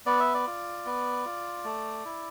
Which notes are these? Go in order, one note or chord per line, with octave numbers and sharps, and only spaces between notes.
B3 D5
E5
D5
F4
B3
F4
A3
E4